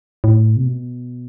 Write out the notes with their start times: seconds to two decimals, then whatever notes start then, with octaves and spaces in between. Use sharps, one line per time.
0.24 A2
0.56 C3
0.65 B2